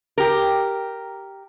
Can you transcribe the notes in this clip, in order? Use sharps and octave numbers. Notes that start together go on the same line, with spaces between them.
G4 A#4